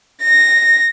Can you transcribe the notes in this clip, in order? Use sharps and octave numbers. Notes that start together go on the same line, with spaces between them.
A#6